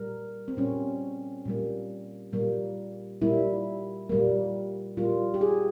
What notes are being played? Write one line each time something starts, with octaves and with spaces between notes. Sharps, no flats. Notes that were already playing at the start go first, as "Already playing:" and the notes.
Already playing: A#2 G3 A#3 A#4
C4
A#2 G3 A#3 C#4
A#2 G3 A#3
A#2 G3 A#3
A#2 G3 A#3 E4
A#2 G3 A#3
A#2 G3 A#3 F4
G4
G#4